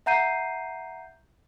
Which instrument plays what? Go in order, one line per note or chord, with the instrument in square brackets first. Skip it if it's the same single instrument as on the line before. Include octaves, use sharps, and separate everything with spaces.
[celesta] E5 F#5 A#5 G6 C7 D#7